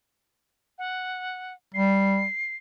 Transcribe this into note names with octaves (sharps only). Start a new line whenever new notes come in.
F#5
G3 C7